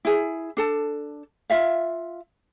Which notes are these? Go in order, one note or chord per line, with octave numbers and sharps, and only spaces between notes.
E4 G#4
D4 A4 A5
F4 E5 F5